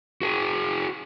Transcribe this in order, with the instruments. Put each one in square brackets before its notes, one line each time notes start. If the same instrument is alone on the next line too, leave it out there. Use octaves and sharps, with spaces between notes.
[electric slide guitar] F#4 G#4